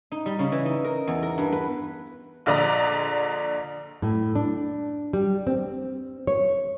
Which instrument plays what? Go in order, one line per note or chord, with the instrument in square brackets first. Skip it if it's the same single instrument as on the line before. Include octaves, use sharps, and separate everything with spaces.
[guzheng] D#4
G3
C#3
E3
D#4
A#4
E2
A#4
G2
B4
[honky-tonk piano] A#1 D3 D5 D#5 A#5
[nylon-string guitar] A2
D4
G3
C4
C#5